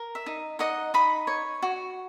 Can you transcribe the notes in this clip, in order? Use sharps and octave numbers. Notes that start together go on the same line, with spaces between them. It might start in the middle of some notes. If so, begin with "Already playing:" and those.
Already playing: A#4
E5
D#4
D#4 D#5 F#5
D#4 B5 D#6
C#5
F#4